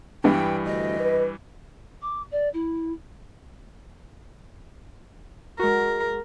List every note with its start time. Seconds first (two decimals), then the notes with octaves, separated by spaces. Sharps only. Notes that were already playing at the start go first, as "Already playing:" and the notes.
0.24 G2 E3 G3 G#3 B3 D4 G5
0.65 D2 D#5
1.00 B4
2.01 D6
2.31 D5
2.53 E4
5.60 G#3 F#4 A#4